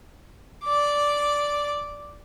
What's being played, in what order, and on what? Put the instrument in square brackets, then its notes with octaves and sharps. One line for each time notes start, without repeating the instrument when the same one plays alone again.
[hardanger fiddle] D5 D6